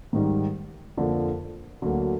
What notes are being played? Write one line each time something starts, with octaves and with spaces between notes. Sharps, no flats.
G#2 D#3 G3
F2 D3 F3 A#3 D4
D2 D3 F#3 A#3